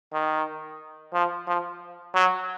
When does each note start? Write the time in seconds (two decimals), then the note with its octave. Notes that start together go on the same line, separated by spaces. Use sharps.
0.13 D#3
1.14 F3
1.47 F3
2.15 F#3